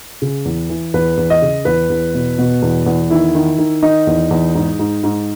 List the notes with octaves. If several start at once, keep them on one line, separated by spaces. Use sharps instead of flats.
C#3
E2
E3
E2 B4
E2
D#5
C#3
E2 B4
E2
B2
B2
E2
E2
D#3 E4
D#3
D#3
D#3 D#4
E2
E2
G#2
G#2
G#2